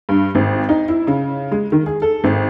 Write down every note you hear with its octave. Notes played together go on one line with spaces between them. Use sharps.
G2
G#1
D#4
E4
C#3
G#3
D#3
G#4
A4
G#1